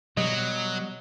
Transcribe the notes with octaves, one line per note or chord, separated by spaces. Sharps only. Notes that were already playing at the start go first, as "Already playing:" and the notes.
B2 F#3 G3 D#5